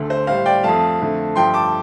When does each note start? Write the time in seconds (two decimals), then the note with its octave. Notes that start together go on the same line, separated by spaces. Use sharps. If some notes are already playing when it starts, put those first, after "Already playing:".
Already playing: D2 D3 A3
0.10 C5
0.27 A2 G3 C5 F5
0.46 D5 G5
0.63 F2 F3 A3 F5 A5
1.00 F2 D3 A3
1.36 G2 F3 A3 G5 C6
1.54 A5 D6